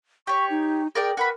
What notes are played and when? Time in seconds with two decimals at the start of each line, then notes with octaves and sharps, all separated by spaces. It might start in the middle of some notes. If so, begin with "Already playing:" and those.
0.27 G4 C#5 C#6
0.50 D#4
0.95 G#4 A#4 D5 G5
1.17 F#4 A#4 B4 B5